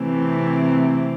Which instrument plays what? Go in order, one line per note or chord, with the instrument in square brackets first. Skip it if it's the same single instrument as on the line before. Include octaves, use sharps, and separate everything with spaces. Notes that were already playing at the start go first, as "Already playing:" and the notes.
Already playing: [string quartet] C3 E3 A3 C4